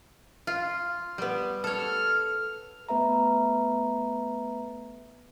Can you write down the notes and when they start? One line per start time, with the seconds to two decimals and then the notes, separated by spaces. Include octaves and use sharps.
0.47 F4
1.18 G3 B3
1.64 A4 C#5 F6
2.89 A3 B3 B4 E5 A#5